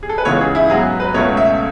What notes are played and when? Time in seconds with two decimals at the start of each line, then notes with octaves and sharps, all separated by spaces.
0.03 G#4
0.09 A4
0.18 B4
0.25 C#2 C#3 E3 G#3 B3 C#5
0.41 G#4
0.55 E4
0.70 G#2 F#3 B3 G#4
1.00 B4
1.14 C#2 B2 A3 C#4 C#5
1.37 E5